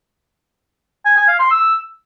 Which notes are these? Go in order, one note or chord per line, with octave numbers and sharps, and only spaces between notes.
G#5
G#5
F5
C6
E6